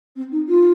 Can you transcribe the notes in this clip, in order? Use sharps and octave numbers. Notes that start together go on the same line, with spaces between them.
C4
D#4
F4